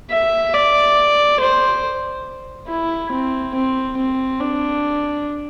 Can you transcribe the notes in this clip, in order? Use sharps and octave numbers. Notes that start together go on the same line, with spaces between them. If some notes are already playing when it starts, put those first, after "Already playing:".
E5
D5
C5
E4
C4
C4
C4
D4